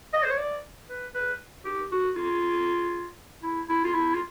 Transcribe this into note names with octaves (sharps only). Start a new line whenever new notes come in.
D#5
C5
C#5
D5
B4
B4
G4
F#4
F4
E4
E4
F4
E4
F4